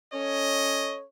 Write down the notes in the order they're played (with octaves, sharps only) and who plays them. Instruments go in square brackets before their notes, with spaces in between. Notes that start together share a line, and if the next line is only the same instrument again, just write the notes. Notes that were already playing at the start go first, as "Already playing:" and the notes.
[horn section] C#4 A4 C#5 [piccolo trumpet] D#5